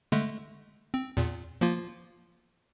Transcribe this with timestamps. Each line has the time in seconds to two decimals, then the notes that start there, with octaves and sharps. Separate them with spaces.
0.12 D3 G#3 A3
0.94 C4
1.17 E2 A#2
1.61 F3 A#3 F4